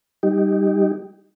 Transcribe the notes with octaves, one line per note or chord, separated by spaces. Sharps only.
G3 D#4 G4